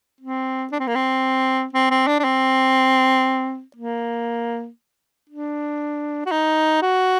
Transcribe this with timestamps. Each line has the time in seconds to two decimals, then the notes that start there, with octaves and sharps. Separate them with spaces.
0.21 C4
0.72 D4
0.80 C4
0.87 A#3
0.95 C4
1.73 C4
1.90 C4
2.07 D4
2.19 D4
2.24 C4
3.76 A#3
5.30 D4
6.26 F#4
6.31 D#4
6.82 F#4